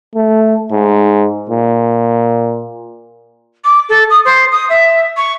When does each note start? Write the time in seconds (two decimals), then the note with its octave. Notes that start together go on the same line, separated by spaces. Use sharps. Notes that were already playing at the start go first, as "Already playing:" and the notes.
0.15 A3
0.71 G#2
1.50 A#2
3.64 D6
3.89 A4
4.10 D#6
4.25 C5
4.51 D#6
4.69 E5
5.17 C#6